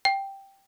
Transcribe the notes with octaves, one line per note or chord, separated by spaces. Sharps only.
G5